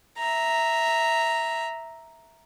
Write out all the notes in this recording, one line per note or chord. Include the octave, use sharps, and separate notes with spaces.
E5 A#5